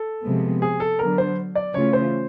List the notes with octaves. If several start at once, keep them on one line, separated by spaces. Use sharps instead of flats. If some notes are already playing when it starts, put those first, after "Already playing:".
Already playing: A4
C3 F3 G#3 B3
G#4
A4
D3 F#3 B3 D4 A#4
C5
D5
C#3 E3 A3 C#4 F4 C#5
C5